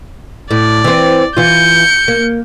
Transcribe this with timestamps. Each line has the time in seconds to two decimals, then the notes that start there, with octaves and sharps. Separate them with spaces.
0.51 A2 D5
0.84 E3 C4
1.37 E3 F4 G6 C#7
2.08 A#3